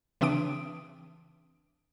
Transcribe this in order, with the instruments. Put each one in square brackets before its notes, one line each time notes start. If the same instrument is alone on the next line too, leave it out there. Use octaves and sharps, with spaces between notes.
[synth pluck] C#3 E3 C4 D4 D#6 D7